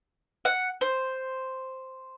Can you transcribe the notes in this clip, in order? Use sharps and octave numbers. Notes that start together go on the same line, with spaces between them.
F#5
C5